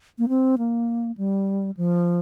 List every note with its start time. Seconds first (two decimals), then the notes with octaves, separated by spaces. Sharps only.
0.18 A#3
0.29 C4
0.58 A#3
1.17 G3
1.77 F3